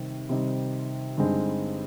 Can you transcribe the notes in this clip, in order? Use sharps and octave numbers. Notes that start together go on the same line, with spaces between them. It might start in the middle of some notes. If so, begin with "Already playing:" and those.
Already playing: C3 D#3 G3 C4 D#4
C3 D#3 G3 C4 D#4
G2 D3 G#3 C4 D#4